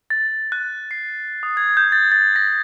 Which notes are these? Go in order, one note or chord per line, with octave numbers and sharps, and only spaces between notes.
A6
F#6
C7
D#6
G#6
G6
A6
A6
A#6